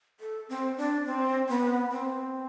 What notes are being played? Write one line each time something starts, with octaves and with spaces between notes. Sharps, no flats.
A4
C4
D4
C4
B3
C4